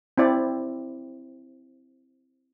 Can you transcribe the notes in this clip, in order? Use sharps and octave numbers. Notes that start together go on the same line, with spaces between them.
C4 E4 D5